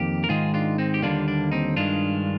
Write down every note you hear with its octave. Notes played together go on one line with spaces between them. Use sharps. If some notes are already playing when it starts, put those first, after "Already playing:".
Already playing: F2 D#3 A#3 G4
A#4
G#2 D#3 G#3 F4 G#4
D4 F4
C4 D#4
G4
D#2 D3 G3 A#3 D4 F4
D4
C4 D#4
G2 D#3 G#3 D4 F4